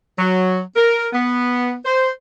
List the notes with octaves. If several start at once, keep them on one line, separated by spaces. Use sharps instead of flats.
F#3
A#4
B3
C5